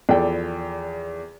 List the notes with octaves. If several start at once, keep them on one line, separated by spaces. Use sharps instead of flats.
E2 F3 A4 D5 G5